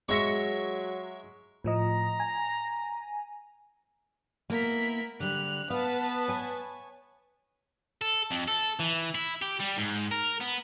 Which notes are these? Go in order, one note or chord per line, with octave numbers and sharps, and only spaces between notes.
F#3 G#3 E5 C#6 A#6 C#7
A2 F3 D#5 A#5
G#5
A#3 B3 E4 A#4 B6
D3 G3 F#6 F7
B3 B4 F5 A5
C#5 G#5
A4
F2
A4
E3
E4
G4
G3
G#2
A#4
B3